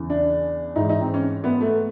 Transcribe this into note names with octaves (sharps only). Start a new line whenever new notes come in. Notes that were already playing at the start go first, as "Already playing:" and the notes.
Already playing: E2 C#3 E3
D4
G#2 E3 D#4
D#4
C4
C#4
B3
A3